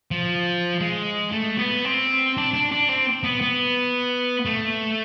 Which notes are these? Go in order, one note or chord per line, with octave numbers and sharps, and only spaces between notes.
F3
G#3
A3
B3
C4
D4
D4
D4
C4
B3
B3
A3